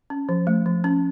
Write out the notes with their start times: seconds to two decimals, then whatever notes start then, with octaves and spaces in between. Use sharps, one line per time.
0.10 C#4
0.29 F3
0.47 A3
0.66 F3
0.84 C#4